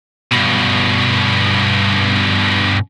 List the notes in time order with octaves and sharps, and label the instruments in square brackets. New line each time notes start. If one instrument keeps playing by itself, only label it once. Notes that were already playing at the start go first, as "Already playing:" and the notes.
[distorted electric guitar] G2 B2